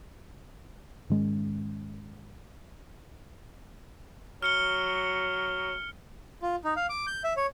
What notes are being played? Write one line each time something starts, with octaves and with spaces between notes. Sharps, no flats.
G#2 D#3 G#3 C#4
F#3 F6 C#7 G7
F4
D#4
F5
D6
G6
E5
C#5